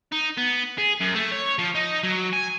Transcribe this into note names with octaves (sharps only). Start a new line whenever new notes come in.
D#4
B3
G#4
F#2
A3
C#5
F3
D#4
F#3
G#5